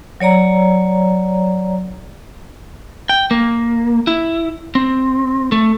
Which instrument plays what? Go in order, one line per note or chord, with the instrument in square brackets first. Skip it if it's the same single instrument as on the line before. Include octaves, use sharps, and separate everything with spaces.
[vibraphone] F#3 C#5 D5 A#5
[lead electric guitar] G5
A#3
E4
C4
A3